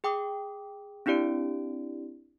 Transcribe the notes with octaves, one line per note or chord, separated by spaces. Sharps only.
G#4 G5 D6 D#6
C4 D4 E4 G4 D5 D7